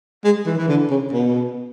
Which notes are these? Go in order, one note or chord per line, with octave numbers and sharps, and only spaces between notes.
G#3
E3
E3
D3
C#3
B2